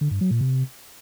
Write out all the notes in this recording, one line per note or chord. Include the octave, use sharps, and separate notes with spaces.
D3
G2
F#3
A#2
C3